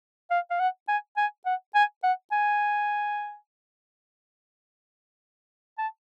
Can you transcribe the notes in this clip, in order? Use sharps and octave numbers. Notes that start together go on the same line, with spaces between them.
F5
F5
F#5
G#5
G#5
F#5
G#5
F#5
G#5
A5